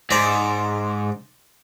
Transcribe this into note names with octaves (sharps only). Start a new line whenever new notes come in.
G#2 C5 D5 A#5